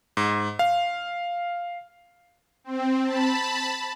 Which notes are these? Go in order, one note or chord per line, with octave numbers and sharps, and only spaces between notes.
G#2
F5
C4
A5 B5